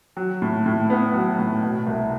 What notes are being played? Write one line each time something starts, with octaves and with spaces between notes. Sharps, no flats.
F#3
A2
A2
B3
F#3
A2
B2
C2